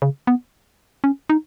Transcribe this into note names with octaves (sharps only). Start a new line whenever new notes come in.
C#3
B3
C#4
D#4